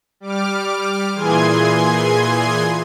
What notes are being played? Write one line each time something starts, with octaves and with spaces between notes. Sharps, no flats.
G3 D6 F6
A#2 E3 G#4 G#5 C6 G#6